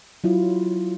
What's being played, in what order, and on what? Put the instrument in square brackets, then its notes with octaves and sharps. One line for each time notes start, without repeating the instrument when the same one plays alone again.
[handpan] F#3 E4 F4